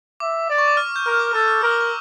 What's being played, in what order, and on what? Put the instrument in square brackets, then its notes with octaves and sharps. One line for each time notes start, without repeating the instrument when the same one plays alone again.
[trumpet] E5 [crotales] D6
[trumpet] D5
[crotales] C#6
D6
F6
G6
[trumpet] A#4 [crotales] F6
[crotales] D6
[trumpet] A4 [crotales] F6
[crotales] F6
[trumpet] A#4 [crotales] E6
[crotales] D6
C#6